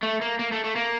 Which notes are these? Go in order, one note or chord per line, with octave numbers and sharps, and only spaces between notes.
A3
A#3
A#3
A3
A3
A#3